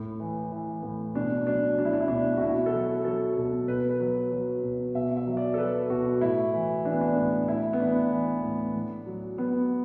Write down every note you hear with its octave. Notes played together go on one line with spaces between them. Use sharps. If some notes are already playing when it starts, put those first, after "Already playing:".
Already playing: A2
E3
E3
A2
B2 D4
F#3 D4
F#3 D4
E4
D4
E4
B2 D4
F#4
B2 E4
A4
F#3 F#4
F#3 A4
B2
B2 B4
B4
F#3
F#3
B2
B2 E5
E5
F#3
D5
A4
F#3 B4
B2 F#4
A2 E4
E3
E3 D4
B3
D4
A2
A2 E4
B3
E3 D4
E3
A2
A2
F#3
F#3 B3